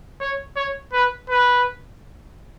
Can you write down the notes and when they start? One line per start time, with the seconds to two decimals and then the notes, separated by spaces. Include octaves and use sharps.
0.20 C#5
0.56 C#5
0.93 B4
1.30 B4